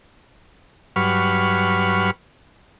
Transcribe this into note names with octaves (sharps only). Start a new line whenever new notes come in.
G2 F#3 B4 C#6 F6